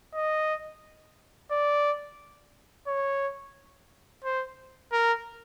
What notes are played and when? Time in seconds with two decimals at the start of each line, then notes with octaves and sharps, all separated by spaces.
0.15 D#5
1.51 D5
2.88 C#5
4.24 C5
4.92 A#4